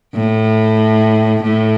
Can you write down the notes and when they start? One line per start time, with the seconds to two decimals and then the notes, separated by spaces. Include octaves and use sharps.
0.14 A2
1.44 A2